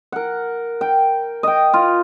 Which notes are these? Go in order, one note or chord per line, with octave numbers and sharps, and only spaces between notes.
A#4 F#5
G5
D#5 G5
F4